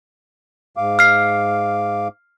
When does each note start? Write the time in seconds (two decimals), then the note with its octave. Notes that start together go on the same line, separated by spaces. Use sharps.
0.77 G#2 F5 D6
0.99 F6 C7